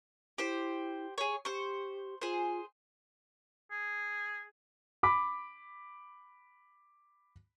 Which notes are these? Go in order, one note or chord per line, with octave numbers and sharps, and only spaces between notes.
E4 G4 C5
G#4 C#5
G4 C5 C#6
F4 G#4 C5
G#4
B5 D6 B6